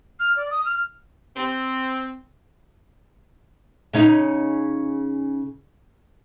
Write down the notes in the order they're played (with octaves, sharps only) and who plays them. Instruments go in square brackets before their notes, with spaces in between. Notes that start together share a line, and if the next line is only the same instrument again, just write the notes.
[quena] F6
D5
D#6
F6
[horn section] C4
[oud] C#3 C#4 D#4